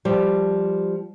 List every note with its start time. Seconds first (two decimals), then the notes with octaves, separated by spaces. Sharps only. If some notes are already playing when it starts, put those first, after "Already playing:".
0.05 F3 G3